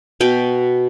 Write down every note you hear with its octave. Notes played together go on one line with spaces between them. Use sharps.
B2 G5